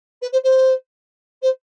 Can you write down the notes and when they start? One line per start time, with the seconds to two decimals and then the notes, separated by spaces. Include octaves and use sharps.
0.21 B4
0.32 C5
0.43 C5
1.42 C5